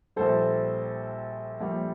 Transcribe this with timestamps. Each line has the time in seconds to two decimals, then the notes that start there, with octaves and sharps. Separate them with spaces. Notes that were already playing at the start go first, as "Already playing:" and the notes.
0.16 A#1 A#2 G3 A4 C5
1.60 A#1 A#2 G3